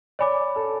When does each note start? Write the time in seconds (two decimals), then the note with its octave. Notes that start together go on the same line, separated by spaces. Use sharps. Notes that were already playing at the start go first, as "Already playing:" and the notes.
0.19 C#5 D5 G#5 B5 D6
0.56 A4